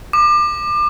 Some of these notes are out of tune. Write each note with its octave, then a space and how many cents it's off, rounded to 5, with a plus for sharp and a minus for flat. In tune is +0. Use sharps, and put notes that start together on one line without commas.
D6 +30